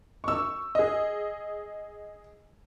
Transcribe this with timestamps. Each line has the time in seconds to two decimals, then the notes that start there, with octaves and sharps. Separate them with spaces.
0.24 C#6 E6
0.75 G#4 D#5